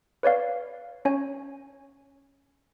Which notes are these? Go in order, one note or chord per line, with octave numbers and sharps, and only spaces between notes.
B4 C#5 D5 F5
C#4 C#5 G#5